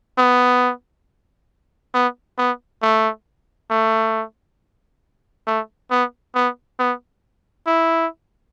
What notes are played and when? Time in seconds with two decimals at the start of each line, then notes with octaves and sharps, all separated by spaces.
0.18 B3
1.94 B3
2.38 B3
2.82 A3
3.70 A3
5.47 A3
5.91 B3
6.35 B3
6.79 B3
7.67 E4